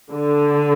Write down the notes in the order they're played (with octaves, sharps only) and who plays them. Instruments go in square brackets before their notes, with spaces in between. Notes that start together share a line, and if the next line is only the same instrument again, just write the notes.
[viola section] D3